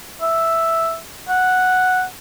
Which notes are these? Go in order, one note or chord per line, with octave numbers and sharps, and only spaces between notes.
E5
F#5